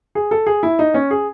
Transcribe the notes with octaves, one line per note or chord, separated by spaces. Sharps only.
G#4
A4
G#4
E4
D#4
C#4
G#4